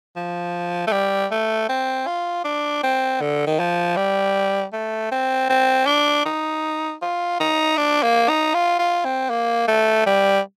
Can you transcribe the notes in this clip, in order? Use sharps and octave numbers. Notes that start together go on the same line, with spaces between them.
F3
A3
G3
A3
C4
F4
D4
C4
D3
D#3
F3
G3
A3
C4
C4
D4
D#4
F4
D#4
D4
A#3
D#4
F4
F4
C4
A#3
A3
G3